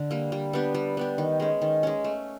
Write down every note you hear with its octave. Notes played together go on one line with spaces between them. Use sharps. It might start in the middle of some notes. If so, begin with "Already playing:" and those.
Already playing: D3
G3 A#3
G3
B3 D4 G4
G3
B3 D4 G4
D#3
G#3 C#4
D#3
G#3 C#4
A3